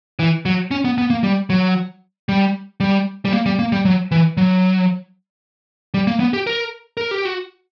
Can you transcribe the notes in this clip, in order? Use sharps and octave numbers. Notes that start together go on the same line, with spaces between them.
E3
F#3
C#4
B3
B3
A#3
G3
F#3
G3
G3
G3
A#3
G3
A#3
G3
F#3
E3
F#3
G3
A#3
B3
G4
A#4
A#4
G4
F#4